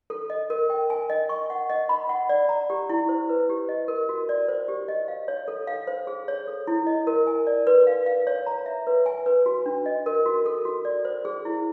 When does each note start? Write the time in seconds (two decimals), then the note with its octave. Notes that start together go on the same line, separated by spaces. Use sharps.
0.10 A4
0.30 D#5
0.50 A#4
0.70 G5
0.90 G#5
1.10 D#5
1.29 C#6
1.50 F#5
1.70 D#5
1.89 B5
2.09 F#5
2.29 D5
2.49 A#5
2.70 G4
2.89 E4
3.09 C5
3.29 B4
3.49 G4
3.69 D#5
3.88 A#4
4.09 F#4
4.29 D5
4.48 C5
4.68 G4
4.88 D#5
5.08 F5
5.28 C#5
5.48 A4
5.67 F5
5.87 C5
6.07 G#4
6.28 C#5
6.47 A4
6.67 E4
6.87 D#5
7.07 A#4
7.27 G#5
7.47 D5
7.67 B4
7.87 F5
8.06 F5
8.27 C#5
8.46 A#5
8.66 E5
8.87 B4
9.06 G#5
9.26 B4
9.46 F#4
9.66 D4
9.86 D#5
10.06 A#4
10.26 F#4
10.46 A4
10.65 F#4
10.85 D5
11.05 C5
11.25 G#4
11.45 E4